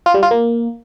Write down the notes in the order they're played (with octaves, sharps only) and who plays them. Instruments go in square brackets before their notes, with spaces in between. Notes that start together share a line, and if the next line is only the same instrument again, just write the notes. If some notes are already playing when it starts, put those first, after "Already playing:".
[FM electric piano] F4
G3
F4
A#3